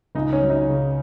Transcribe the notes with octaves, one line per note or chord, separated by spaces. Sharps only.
C#2 D#4
C#4
F#3
D#4
C#3